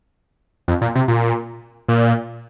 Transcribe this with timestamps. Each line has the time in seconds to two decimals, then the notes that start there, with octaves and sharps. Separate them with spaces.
0.68 F2
0.81 A#2
0.95 C3
1.08 A#2
1.88 A#2